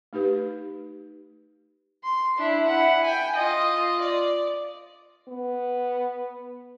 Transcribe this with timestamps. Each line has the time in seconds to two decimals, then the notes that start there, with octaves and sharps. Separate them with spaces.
0.13 A3 D#4 G4 B4
2.04 C6
2.37 D4 E4
2.67 E4 F#5
3.04 G5 G#5
3.36 F4 D#5
4.01 D5
5.29 B3